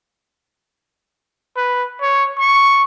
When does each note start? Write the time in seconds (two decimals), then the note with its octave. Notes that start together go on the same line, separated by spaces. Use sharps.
1.57 B4
2.01 C#5
2.38 C#6